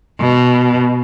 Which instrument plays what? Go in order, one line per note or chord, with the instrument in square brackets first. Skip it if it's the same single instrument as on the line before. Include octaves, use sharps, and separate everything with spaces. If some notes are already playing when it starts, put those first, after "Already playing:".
[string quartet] B2